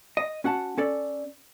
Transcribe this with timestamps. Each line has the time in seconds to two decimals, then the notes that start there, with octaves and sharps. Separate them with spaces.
0.17 D#5
0.44 C#4 F#4 F#5 A5
0.78 C#4 A4 D5